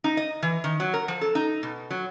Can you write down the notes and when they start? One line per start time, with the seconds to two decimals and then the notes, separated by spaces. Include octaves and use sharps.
0.04 D#4
0.17 D#5
0.42 E3
0.64 D#3
0.80 F#3
0.94 A#4
1.08 F3
1.21 A4
1.35 D#4
1.63 B2
1.90 F#3